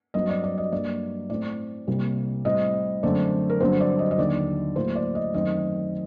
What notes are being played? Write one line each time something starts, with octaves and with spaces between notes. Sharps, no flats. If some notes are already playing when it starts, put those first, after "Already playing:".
G2 F#3 C4 D#5
D5
D5
D#5
G2 F#3 A#3 D5
A2 A3 C4 D5
C2 C3 G3 A#3
A2 G3 C4 D#5
F#2 D3 A3 C4 D5
A#4
G2 D3 F#3 C4 C5
D5
D#5
D#5
D#2 D3 F#3 D5
A2 F#3 A#3 C5
D5
D#5
F#2 D#3 A3 C4 D#5